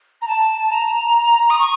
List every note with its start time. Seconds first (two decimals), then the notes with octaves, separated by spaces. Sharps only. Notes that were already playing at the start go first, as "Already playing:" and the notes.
0.21 A#5
0.27 A5
0.70 A#5
1.50 D#6
1.59 C#6